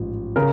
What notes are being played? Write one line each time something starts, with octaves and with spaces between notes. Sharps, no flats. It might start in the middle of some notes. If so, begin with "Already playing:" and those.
Already playing: A1 G#2 F3
C#3 A#4